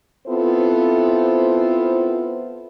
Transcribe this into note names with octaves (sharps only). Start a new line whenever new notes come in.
B3 C4 E4 F4 A4 C5